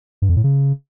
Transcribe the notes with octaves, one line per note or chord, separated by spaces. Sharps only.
G2
F2
A2
C#3